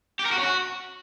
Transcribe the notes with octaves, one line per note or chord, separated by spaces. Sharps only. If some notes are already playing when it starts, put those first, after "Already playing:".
G4
A#4
F#4
C#4
F#4